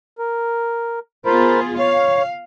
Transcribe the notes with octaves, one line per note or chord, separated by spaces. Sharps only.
A#4
B3 F4 G#4 A#4 C5 B5
C#5 F5